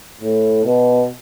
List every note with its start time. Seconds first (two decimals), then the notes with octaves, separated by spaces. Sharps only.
0.21 A2
0.65 B2